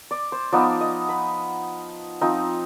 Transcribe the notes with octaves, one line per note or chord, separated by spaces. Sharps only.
D5
C5
F3 B3 D#4 D5
D#5
B5
F3 C4 D#4